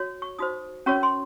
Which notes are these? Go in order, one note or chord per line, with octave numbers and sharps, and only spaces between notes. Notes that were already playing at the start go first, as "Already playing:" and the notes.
Already playing: F#4 C#5
C#6
D#4 F#4 C5 D#6
C#4 F#4 A#4 C#5 C#6
C6